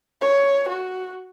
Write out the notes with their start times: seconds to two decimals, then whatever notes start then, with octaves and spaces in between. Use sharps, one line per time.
0.21 C#5
0.69 F#4